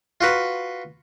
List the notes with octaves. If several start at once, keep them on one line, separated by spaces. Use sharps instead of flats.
F4 F#4 B4